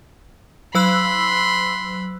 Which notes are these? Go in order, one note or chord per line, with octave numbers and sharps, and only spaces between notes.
F#3 B5 C6 E6 F#6